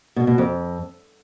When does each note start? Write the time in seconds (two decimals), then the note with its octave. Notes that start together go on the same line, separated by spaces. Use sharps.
0.16 B2
0.27 B2
0.38 F2